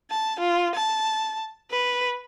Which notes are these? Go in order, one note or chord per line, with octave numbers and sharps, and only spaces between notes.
A5
F4
A5
B4